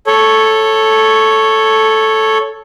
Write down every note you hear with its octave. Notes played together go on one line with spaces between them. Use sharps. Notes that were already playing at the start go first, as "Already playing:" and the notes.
A4 C#5